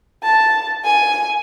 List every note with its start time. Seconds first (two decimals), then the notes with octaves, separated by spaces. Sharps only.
0.23 A5
0.84 G#5